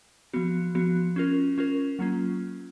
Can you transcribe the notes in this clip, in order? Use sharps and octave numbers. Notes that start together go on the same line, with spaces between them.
F3 B3 F#4
F3 B3 F#4
C#4 F4 A#4
C#4 F4 A#4
F#3 A#3 C#4 F4